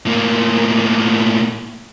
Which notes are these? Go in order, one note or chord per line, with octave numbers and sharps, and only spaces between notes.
A2 A#3